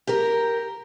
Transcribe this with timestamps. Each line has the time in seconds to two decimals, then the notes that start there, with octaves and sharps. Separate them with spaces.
0.07 G4 A#4